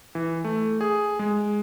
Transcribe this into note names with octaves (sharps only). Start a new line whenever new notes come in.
E3
A3
G#4
G#3